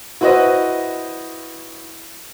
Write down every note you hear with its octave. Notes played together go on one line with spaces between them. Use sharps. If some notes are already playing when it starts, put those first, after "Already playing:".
E4 F#4 B4 C5 D#5